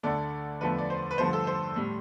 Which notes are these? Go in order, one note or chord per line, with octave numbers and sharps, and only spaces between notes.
D2 D3 A3 D5
E2 D3 F3 A3 B4
D5
C5
B4
G2 D3 F3 A3 C5
A4
C5
A2 G3